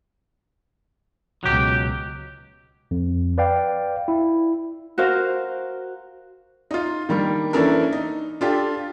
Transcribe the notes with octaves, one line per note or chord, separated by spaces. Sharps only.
C#2 B2 F#3 G4
F2
B4 D5 F5 G5
E4
F#4 A#4 C5 F5
D#4 F4
D#3 G3 A#3 D4
E3 A#3 C#4 D4 A4 A#4
D#4
D4 F4 G4 A4